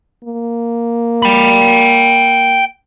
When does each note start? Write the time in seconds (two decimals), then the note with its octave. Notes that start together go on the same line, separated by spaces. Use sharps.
0.24 A#3
1.23 G5 B5